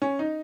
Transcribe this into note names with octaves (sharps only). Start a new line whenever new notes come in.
C#4
D#4